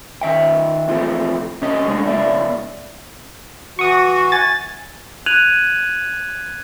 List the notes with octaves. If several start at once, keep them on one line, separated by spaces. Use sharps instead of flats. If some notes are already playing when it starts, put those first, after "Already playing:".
D#3 E5 G5
C3 E3 F3 A3 C4
C3 C#4 G4 D#5
G#3 A3 C4 D4
C#2 B3 D5 E5
E3 F#4 C#6 D#6
G#5 A6
F#6 G#6 D#7 F7 F#7